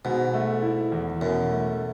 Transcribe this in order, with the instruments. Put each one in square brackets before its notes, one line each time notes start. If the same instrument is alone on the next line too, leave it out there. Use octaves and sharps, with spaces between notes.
[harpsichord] G#2 [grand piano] B2
[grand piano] A3
E4
E2
[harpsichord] F#2 [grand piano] B2
[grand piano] A3